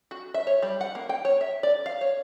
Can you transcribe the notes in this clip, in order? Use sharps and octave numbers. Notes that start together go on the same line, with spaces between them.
F#4
E5
C#5
G3
F#5
A#3
G5
C#5
E5
D5
F5
C#5